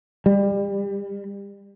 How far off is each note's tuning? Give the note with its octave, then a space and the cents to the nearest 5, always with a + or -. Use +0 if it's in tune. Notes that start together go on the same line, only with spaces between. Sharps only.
G3 +30